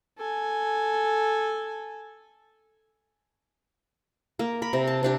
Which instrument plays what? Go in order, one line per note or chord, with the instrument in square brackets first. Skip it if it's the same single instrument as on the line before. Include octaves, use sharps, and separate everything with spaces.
[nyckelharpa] A4 G#5
[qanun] A#3 A#4
A#4 B5
C3
A5
C3 D4 G4